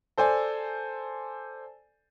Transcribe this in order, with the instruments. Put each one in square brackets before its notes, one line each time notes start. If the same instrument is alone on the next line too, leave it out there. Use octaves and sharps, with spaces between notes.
[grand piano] A4 C5 D5 G#5